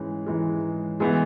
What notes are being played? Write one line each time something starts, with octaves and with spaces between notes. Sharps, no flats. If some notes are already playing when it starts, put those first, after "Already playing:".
Already playing: G#2 E3 G#3 C#4
G#2 E3 G#3
E3 G#3 B3 E4 G#4